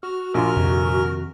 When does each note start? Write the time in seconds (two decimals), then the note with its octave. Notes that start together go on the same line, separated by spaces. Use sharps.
0.03 F#4 F6
0.34 A#1 F4 A#4 D6 F6
0.57 F2 C3 D#3